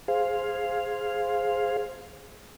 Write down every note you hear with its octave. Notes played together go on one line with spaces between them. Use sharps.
G#4 C5 F5